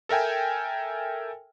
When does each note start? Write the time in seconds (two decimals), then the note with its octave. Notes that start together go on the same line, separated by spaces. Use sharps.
0.09 A4 A#4 E5 G5 G#5